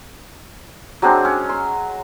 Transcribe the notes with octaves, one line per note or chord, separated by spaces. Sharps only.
F#3 G#3 C4 D4
C#4
C6